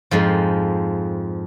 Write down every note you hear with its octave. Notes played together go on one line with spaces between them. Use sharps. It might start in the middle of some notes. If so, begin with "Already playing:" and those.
F2 G#2 F3